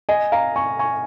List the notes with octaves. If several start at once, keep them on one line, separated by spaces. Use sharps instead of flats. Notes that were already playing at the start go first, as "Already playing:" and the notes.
D#5 G#5
F5 A#5
G#5 C#6
G#5 C#6